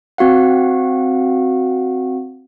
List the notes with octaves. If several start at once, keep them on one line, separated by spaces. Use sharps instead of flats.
C4 F#4 F5 F#5